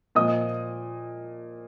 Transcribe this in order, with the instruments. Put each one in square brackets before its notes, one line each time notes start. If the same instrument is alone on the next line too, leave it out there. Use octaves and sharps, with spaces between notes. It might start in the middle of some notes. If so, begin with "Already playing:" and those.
[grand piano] A#2 F3 D#5 D#6